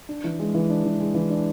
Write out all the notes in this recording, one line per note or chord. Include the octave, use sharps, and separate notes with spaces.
D4
E3
G#3
E3
D4
E3
G#3
E3
D4